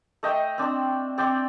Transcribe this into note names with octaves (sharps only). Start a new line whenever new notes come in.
A3 D#5 G5
C4 D4
C4 D5 G5